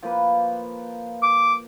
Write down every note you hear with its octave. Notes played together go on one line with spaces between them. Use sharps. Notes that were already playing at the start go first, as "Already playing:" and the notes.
F3 A#3 B4
D6